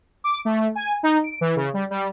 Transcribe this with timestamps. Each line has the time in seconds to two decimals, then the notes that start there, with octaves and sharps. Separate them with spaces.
0.24 D6
0.45 A3
0.75 G#5
1.03 D#4
1.24 D7
1.41 E3
1.56 C#3
1.74 G3
1.91 G3